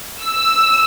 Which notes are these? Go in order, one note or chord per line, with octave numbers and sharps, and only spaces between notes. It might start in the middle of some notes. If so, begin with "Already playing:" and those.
E6